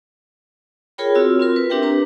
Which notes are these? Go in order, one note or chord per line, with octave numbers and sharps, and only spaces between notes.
F4 G#4 A#4 C#5 G5 B5
C4 F4 F#4 E6
C4 F4 A#4
B4
C4 D4 G4 A#4 E5 G5
D4 B4 A#5